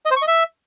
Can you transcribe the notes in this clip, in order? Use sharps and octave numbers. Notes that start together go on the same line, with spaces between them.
D#5
C5
C#6
D#5
E5